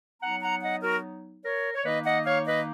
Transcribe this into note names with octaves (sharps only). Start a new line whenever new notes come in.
F#3 B3 D#4 F#5 A#5
F#5 A#5
D#5 F#5
F#4 A#4
A#4 C#5
C#5
D#3 A#3 D#4 B4 D#5
D#5 F#5
C#5 F5
B4 D#5